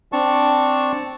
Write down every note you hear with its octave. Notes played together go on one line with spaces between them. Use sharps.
C4 D4 A5 C#6